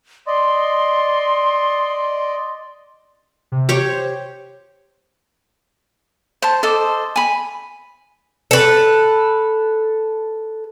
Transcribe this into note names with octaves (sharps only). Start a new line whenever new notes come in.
D5 D#5 C6
C3
G4 C#5 C#6
C5
C5 A5
A4 C5 D#5 D6
G#5 B5
A4 B4